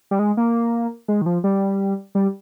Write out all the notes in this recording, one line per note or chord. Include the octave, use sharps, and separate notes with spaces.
G3
G#3
A#3
G#3
D#3
F3
G3
G3